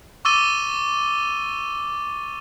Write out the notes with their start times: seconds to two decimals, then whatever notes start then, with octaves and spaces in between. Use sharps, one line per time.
0.25 C#6 D6 E6 A6 D#7 G7